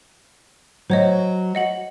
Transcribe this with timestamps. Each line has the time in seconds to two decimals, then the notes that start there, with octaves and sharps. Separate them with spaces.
0.90 F#3 C5 C#5 D#5
1.55 D#5 F#5 F#7